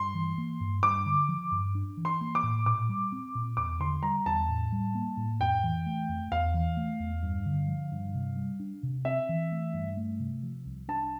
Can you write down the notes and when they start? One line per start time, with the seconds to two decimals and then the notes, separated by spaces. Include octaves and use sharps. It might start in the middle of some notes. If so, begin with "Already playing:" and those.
Already playing: G2 C6
0.15 E3
0.38 A#3
0.60 G2
0.83 G2 D6
1.06 D3
1.29 F3
1.52 G2
1.75 D4
1.97 E3
2.05 C6
2.21 A#3
2.35 D6
2.43 A2
2.66 A#2 D6
2.89 G3
3.12 C4
3.35 A#2
3.57 E2 D6
3.80 D3 C6
4.03 G3 A#5
4.25 E2 A5
4.49 A2
4.72 G3
4.95 A#3
5.17 A2
5.40 F2 G5
5.63 E3
5.86 A3
6.09 F2
6.31 E2 F5
6.54 E3
6.77 A3
7.00 E2
7.23 G2
7.46 D3
7.68 F3
7.92 G2
8.14 C3
8.36 G3
8.60 D4
8.83 C3
9.05 C4 E5
9.29 E3
9.52 A3
9.74 G2
9.97 A3
10.20 C3
10.43 F3
10.65 C2
10.88 D4 A5